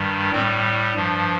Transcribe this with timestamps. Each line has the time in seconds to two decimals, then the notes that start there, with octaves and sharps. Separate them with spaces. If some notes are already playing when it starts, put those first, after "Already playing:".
Already playing: G2 D#3 G3
0.32 A2 G3 C4
0.95 G2 F3